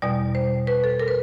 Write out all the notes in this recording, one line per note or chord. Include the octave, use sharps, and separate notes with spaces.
E2 B2 G3 D5
C5
B4
A4
A#4
B4